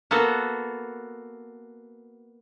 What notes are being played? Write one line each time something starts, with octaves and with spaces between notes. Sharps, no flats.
A#3 B3 F#4 A4